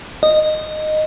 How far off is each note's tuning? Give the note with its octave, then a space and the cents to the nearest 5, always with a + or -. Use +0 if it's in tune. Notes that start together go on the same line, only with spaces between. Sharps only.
D#5 -15